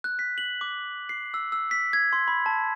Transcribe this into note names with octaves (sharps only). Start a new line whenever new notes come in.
F#6
B6
F#7
D6
C7
E6
E6
B6
G#6
C6
B5
A5